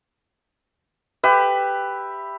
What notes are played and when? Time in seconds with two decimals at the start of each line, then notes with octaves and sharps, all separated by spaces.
1.23 G4 B4 E5